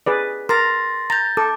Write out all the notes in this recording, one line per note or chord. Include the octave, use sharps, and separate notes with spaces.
G#4 B4 D5
A#4 C6 A6 A#6
A#5 G6 A6
A4 D6